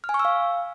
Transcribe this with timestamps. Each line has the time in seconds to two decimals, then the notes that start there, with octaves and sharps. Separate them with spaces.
0.04 F6
0.09 G#5
0.14 C#6
0.19 E6
0.25 F5